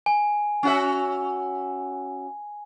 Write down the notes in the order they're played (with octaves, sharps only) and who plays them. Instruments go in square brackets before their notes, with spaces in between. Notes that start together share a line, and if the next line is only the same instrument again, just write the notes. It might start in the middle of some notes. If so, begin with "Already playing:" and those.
[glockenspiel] G#5
[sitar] C#4 F#4 E5